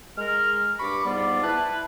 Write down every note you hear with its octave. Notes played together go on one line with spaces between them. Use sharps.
G#3 A#4 F6
G2 B5 C#6 D6
G#2 G3 B3 F4 D5
E4 B4 A5